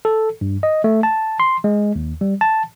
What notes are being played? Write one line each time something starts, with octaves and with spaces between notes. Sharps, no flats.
A4
G2
D#5
A3
A5
C6
G#3
D#2
G3
A5